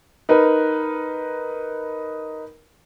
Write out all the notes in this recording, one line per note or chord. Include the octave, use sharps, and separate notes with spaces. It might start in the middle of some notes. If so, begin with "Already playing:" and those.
D#4 A#4 B4